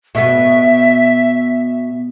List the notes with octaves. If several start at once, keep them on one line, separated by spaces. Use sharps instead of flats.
B2 B3 E5